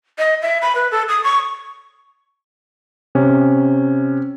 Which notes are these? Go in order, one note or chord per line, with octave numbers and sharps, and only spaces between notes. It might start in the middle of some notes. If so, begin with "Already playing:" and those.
D#5
E5
B5
B4
A4
D#6
C#6
C3 C#4